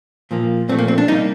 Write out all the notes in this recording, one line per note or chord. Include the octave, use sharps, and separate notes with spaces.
A#2 F3 A#3
A#2 F3 A3 C4
A#3
C4
D4
C3 G3 A#3 D#4